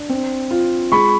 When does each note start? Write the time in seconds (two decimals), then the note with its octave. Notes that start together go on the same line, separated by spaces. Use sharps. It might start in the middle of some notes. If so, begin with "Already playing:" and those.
Already playing: D4
0.09 C4
0.51 F4
0.92 G#3 B5 C#6